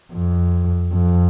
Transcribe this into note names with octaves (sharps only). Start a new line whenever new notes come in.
F2
F2